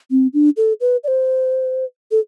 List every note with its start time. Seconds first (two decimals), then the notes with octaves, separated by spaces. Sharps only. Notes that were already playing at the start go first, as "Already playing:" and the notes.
0.11 C4
0.34 D4
0.57 A4
0.81 B4
1.04 D5
1.08 C5
2.11 A4